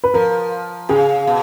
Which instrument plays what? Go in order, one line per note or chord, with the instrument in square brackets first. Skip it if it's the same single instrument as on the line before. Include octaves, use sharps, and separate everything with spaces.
[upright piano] B4
[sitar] F3 [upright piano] A#4
[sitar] C#3 [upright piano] G#4
[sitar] B2